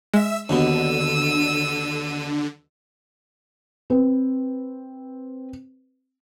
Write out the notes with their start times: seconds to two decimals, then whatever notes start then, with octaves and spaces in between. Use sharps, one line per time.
0.14 G#3 E5 E6
0.49 D#2 B2 D3 B3 E6 D#7
3.90 C4 B4